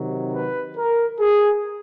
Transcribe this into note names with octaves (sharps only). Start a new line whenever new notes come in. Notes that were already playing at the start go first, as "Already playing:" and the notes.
Already playing: C3 D#3 F#3
B4
A#4
G#4